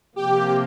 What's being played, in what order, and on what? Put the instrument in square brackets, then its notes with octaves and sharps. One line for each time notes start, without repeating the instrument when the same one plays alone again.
[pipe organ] C3 F3 A#3 [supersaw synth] G4